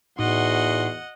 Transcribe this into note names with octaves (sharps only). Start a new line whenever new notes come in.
E2 A2 D#4 F#4 D#5 F#5 C6